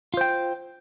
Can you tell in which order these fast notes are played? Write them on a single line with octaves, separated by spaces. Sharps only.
F4 C5 G5